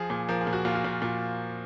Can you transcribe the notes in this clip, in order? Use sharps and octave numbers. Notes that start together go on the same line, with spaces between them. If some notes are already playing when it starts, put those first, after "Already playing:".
Already playing: F3 G#4
A#2
F3 A#4
G#4
A#2
F#4
A#2 F4
F#4
A#2 F4
A#2